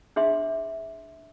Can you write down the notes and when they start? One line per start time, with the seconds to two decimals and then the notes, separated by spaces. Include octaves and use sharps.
0.16 D4 G#4 E5 C6